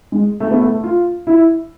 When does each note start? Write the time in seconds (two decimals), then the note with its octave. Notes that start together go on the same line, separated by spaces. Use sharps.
0.12 G#3
0.40 A3
0.51 B3
0.61 A3
0.83 F4
1.27 E4